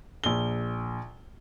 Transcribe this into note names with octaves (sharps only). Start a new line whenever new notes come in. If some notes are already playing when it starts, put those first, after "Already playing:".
A#1 G7